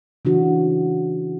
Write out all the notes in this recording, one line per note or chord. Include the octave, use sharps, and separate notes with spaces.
C#3 E3 D4 F#4